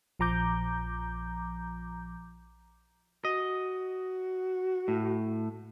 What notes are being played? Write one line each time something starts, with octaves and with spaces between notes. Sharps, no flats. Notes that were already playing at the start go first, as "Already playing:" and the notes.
A#1 F3 A#5 D6 G6
F#4 D#5
A2